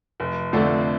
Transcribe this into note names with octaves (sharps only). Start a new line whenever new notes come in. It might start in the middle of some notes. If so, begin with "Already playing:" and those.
F1
F2 D3 A3 D4